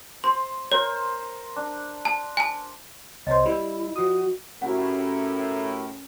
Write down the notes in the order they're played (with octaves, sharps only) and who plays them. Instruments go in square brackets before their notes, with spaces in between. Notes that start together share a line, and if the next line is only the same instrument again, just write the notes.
[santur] C5 [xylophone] C6
[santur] A#4 C5 [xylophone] C#5
[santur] D4
[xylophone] A5
G#5 A5
[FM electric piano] C2 C5 [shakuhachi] C#5 [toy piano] D#5
[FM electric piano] G3 [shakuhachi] E4 [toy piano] D5 B5
[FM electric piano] F3 D#6 [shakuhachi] F#4
[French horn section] A2 [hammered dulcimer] C#4 [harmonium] E4 G4 A#4 [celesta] F#4 F#5